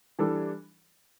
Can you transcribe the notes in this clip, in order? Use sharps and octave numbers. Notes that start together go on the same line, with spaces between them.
E3 G3 D4 A4